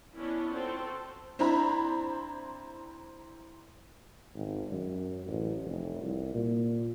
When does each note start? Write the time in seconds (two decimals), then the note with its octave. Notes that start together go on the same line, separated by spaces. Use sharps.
0.17 B3 C#4 D4 E4 C#5
0.52 C4 F4 F#4 A4 C5
1.39 C4 D4 E4 A#5 B5
4.35 G#1
4.72 F#2
5.27 A1
5.65 F1
6.02 C2
6.34 A#2